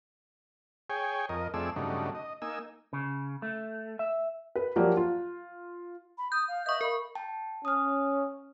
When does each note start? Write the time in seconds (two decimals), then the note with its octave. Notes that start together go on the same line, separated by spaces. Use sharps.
0.90 G#4 C#5 G5 G#5
1.29 F2 A#4 D#5
1.54 F2 A3 C4 G#4 D5 E6
1.76 G2 C#3 F#3 A3 D4 D#4
2.15 D#5
2.42 A#3 D#4 G#5 E6
2.93 C#3
3.42 A3
3.99 E5
4.56 B4
4.76 F3 F#3 A#3 G4 D5
4.97 F4
6.18 B5
6.32 D#6 G6
6.48 F5
6.66 B4 D#5 E5 C#6 D#6 G6
6.81 A#4 F5 B5 C#6
7.15 G5 A5
7.65 C#4 D#6 F6